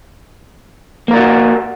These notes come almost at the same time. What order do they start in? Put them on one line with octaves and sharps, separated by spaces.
A#3 A#4 D5 F#4